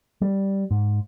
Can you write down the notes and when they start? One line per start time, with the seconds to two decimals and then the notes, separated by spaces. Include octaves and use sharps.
0.21 G3
0.71 G#2